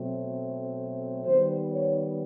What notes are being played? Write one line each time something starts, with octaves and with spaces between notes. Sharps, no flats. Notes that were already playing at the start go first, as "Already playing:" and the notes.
Already playing: B2 F#3 A3 C4
D#3 G3 B3 C5
C#5